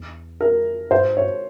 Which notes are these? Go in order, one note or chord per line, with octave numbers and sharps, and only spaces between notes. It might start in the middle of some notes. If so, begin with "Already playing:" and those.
Already playing: E2
F2 A#4
G2 C5
G#2
G2 C#5